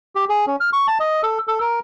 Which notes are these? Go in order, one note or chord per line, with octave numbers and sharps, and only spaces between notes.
G4
G#4
C#4
F6
C#6
A5
D#5
A4
A4
A#4